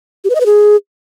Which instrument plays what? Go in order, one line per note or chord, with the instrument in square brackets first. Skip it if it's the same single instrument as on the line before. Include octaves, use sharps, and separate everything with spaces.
[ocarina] G4
B4
D#5
B4
G#4